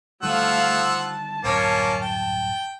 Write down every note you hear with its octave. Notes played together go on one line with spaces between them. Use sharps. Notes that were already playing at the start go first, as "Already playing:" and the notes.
D3 D#3 F3 G3 A3 F5 F#5 E6
A5
D1 G1 F#2 A#3 C#4
G5